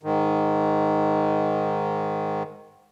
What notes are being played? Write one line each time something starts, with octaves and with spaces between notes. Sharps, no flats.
G#2 D#3